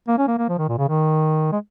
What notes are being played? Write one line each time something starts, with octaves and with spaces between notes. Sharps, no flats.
A#3
C#4
A#3
A#3
F3
D#3
A#2
C#3
D#3
G#3